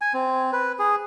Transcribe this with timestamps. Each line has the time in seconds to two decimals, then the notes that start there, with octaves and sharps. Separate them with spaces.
0.01 G#5
0.14 C4
0.53 B4
0.79 G#4